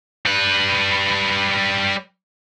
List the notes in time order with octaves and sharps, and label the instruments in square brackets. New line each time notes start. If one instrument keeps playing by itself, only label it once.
[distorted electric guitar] G3 B4